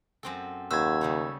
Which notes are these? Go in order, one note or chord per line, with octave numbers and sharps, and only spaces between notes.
F#2 C4 A4
D#2 F#4 B4 C5 E6 G#6
C#3 G3 A3